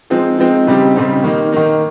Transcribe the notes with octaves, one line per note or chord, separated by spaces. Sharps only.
F3 G#3 C4 D#4
F3 G#3 C4 D#4
C#3 G3 C4 D#4 G4
C#3 G3 C4 D#4 G4
D#3 A#3 D#4
D#3 A#3 D#4